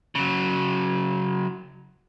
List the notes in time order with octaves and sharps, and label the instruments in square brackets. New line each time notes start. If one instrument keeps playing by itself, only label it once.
[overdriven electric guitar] C#3 F#3